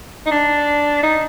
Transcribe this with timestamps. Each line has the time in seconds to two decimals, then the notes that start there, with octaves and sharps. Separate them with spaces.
0.26 D#4
0.31 D4
1.03 D#4